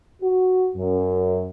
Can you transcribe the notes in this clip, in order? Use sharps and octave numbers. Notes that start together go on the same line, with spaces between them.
F#4
F#2